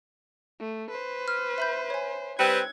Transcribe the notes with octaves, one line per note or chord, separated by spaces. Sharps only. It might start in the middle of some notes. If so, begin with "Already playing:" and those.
A3
B4 C5
F6
E5 B5 G6
C#5 G#5
G3 C4 B4 E6 F#6 G#6 C#7